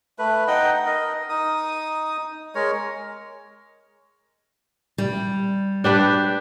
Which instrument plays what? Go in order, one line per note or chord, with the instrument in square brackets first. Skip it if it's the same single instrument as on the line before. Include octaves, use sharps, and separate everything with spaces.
[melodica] A3 B4
D#4 D#5 F#5 G5
A#4 D#5
D#4 D#6
G#3 A#4 C#5
[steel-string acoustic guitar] G3
[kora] D4 G4 B4